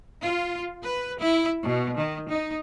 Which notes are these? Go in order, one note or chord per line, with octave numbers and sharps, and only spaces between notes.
F4
B4
E4
B2
D#3
D#4